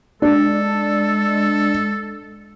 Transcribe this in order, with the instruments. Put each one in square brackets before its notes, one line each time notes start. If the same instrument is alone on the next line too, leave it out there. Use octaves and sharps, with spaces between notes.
[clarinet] G#3 [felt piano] D4 [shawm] A4